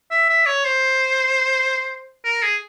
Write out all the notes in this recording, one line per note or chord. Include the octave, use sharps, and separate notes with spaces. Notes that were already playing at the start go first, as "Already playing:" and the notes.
E5
E5
C#5
C5
A#4
G#4